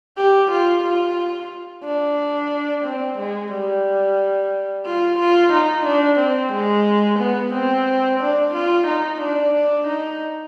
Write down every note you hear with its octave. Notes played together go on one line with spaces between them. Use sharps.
G4
F4
F4
D4
C4
G#3
G3
F4
F4
D#4
D4
C4
G#3
B3
C4
D4
F4
D#4
D4
D4
D#4